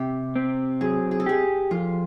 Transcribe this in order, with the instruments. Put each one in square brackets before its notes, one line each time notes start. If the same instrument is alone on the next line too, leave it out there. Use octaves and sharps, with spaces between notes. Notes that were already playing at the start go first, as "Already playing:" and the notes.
Already playing: [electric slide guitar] C3 [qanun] G4
[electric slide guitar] C4
[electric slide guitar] F#3 [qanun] G#4
[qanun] G#4
A4
[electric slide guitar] G4 [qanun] G#4
[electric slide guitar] F2 [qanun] F4